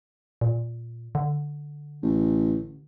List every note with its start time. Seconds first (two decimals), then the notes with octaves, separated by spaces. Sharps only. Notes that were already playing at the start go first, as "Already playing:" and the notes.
0.41 A#2
1.15 D3
2.03 A1